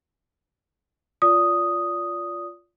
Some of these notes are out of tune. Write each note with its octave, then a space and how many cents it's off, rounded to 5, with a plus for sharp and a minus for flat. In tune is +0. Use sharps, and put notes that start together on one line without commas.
F4 +0 D5 -30 D#6 +0